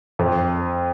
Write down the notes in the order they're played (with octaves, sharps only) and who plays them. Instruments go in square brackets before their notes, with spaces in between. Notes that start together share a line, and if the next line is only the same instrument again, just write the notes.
[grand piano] F2